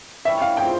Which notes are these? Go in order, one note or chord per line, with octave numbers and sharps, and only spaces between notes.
E3 G3 C#4 E5
F5
F3 C4 E4 G#4 G5